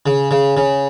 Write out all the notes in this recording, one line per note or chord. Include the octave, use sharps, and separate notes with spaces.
C#3
C#3
C#3